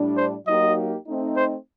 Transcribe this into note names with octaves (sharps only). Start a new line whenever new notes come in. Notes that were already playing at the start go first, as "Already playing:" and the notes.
Already playing: A2 G3 D4
C5
F#3 A#3 D#4 G4 D#5
A3 C4 D#4
C5